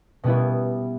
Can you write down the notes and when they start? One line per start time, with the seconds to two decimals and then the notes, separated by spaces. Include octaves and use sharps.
0.24 B2 G3 B3 E4